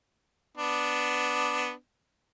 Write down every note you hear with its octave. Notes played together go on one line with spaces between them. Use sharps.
B3 D4